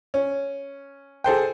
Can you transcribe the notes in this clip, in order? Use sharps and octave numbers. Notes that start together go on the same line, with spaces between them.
C#4
G#4 A4 C5 G5